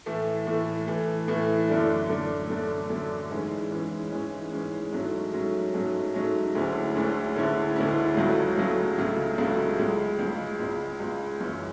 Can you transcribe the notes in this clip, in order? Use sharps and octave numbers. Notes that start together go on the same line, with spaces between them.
A2 E3 A3
A2 E3 A3
A2 E3 A3
A2 E3 A3
F#2 D3 A3 D4
F#2 D3 A3 D4
F#2 D3 A3 D4
F#2 D3 A3 D4
G#2 E3 G#3 C#4
G#2 E3 G#3 C#4
G#2 E3 G#3 C#4
G#2 E3 G#3 C#4
G#2 F#3 A3 C#4
G#2 F#3 A3 C#4
G#2 F#3 A3 C#4
G#2 F#3 A3 C#4
D2 D3 G#3 C#4 E4
D2 D3 G#3 C#4 E4
D2 D3 G#3 C#4 E4
D2 D3 G#3 C#4 E4
C#2 C#3 F#3 A3
C#2 C#3 F#3 A3
C#2 C#3 F#3 A3
C#2 C#3 F#3 A3
C#2 C#3 G#3
C#2 C#3 G#3
C#2 C#3 G#3
C#2 C#3 G#3
F#2 E3 G#3 C#4